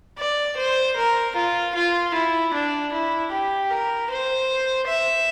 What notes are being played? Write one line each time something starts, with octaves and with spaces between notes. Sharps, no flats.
D5
C5
A#4
F4
F4
E4
D4
E4
G4
A#4
C5
E5